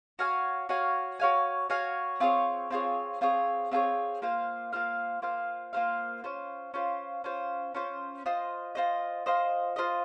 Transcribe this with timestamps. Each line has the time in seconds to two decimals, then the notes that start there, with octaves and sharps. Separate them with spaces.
0.19 F#4 C#5 F5 G#5
0.69 F#4 C#5 F5 G#5
1.20 F#4 C#5 F5 G#5
1.70 F#4 C#5 F5 G#5
2.20 C4 F4 G#4 C#5
2.71 C4 F4 G#4 C#5
3.21 C4 F4 G#4 C#5
3.71 C4 F4 G#4 C#5
4.22 A#3 F4 C5 F5
4.72 A#3 F4 C5 F5
5.22 A#3 F4 C5 F5
5.73 A#3 F4 C5 F5
6.24 C#4 F4 C5
6.74 C#4 F4 C5
7.24 C#4 F4 C5
7.74 C#4 F4 C5
8.26 F4 C5 D#5
8.75 F4 C5 D#5
9.26 F4 C5 D#5
9.76 F4 C5 D#5